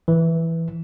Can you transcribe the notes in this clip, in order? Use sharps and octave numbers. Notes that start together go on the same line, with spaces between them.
E3